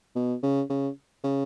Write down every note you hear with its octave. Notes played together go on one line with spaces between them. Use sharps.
B2
C#3
C#3
C#3